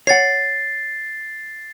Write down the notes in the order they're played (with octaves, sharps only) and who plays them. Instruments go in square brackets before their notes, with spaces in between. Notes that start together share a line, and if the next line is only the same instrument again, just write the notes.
[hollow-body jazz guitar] C#5 F#5 [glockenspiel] A6 C7